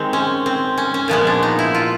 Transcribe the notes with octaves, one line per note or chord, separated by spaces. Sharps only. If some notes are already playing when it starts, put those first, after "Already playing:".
Already playing: D#3 G#3 C4
C#4
C4
C#4
C#4
A#2 F3 G#3 B3 C#4
D4
D#4
E4
F4